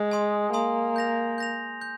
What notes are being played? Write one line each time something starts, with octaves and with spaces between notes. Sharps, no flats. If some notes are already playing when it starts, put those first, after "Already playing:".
Already playing: G#3
G#5 C6 D#6
A#3 G#5 C6 D#6
G6 A#6 F7
G6 A#6 F7
G6